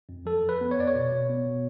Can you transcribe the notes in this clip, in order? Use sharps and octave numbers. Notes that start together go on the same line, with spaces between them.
F2
F3 A4
F2
B4
B3
C#5
F2 D5
C#5
B2
B2
B3
B2